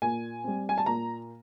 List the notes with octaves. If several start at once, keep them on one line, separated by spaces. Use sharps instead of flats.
A#2 G#5
G3 C4
G#5
A5
A#2 A#5